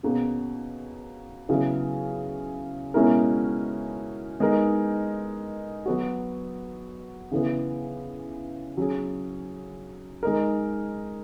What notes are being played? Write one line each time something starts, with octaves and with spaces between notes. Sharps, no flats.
B2 A#3 C#4 G#4
C#3 F#3 B3 E4
B2 G#3 C#4 E4 A#4
G#3 B3 D#4 A#4
F#3 B3 F#4
C#3 E3 B3
F#3 C#4 G#4
G#3 D#4 A#4